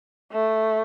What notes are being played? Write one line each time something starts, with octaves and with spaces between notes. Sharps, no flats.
A3